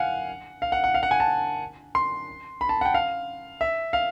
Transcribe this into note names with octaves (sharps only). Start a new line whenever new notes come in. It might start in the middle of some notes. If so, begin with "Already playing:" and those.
Already playing: F5 F#5 G#5
F5
F#5
F#5
F5
F#5
G#5
A5
C6
B5
A5
F#5
G5
F5
E5
F5